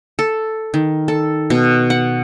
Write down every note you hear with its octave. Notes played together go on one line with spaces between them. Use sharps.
A4
D#3
A4
B2
F#5